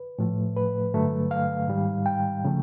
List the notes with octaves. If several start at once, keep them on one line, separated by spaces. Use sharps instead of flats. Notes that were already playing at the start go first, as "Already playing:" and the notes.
Already playing: B4
A2 F3 A3
B4
G2 D3 F#3 A3
F5
G#2 D#3 G3
G5
C#3 F3 A3